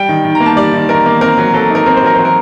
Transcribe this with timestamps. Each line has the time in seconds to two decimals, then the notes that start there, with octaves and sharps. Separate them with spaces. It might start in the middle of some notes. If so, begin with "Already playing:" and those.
Already playing: G3 G5
0.09 D#3
0.24 D#3
0.35 A#5
0.40 A#3
0.46 A5
0.56 G3 D5
0.73 D#3
0.89 D#3 A#4
1.06 A#3
1.21 C4 A#4
1.38 F#3
1.54 F#3 A4
1.70 D#4
1.75 A#4
1.86 C4 A#4
1.97 C5
2.03 F#3 A#4
2.15 F#3 C5
2.25 A#4